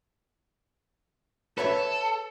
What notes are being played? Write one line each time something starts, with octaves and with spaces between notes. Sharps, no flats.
A4 B4 C#5 E5